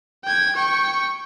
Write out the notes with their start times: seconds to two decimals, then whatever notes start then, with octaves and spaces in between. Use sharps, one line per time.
0.25 G5 G#6
0.55 G5 C#6